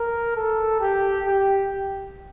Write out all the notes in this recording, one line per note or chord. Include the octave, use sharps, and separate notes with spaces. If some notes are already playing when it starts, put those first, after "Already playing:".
Already playing: A#4
A4
G4
G4